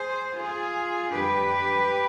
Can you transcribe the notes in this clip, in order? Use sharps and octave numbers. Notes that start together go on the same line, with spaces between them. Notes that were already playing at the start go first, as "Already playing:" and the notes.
Already playing: G#4 C5
F4 G#4
F2 D3 G3 D4 G4 B4